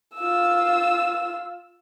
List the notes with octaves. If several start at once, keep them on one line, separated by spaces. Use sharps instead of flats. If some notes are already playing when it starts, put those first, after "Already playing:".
F4 E6